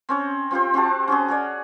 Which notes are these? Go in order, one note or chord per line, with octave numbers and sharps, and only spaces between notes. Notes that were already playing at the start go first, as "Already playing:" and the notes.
C4 C#4 C#5
C4 F4 G4 C5
C4 F#4 G4 A5
C#4 F#4 G#4
G#4 C#5 D5